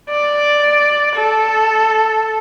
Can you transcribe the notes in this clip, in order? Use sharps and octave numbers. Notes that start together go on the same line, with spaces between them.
D5
A4